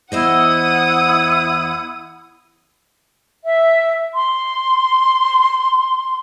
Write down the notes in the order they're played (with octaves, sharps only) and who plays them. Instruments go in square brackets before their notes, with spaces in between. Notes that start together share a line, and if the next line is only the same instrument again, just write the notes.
[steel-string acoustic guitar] E2 C5 D#5 [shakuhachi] E4 [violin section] F#5 D#6
[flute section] E5
C6